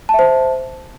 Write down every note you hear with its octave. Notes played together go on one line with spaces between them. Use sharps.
C5 E5 A5